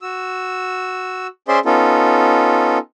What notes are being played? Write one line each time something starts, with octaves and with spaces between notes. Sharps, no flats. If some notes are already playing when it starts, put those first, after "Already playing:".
F#4 E6
C#4 G#4 C5 D5 E5 C6
B3 C#4 D#4 F4 A4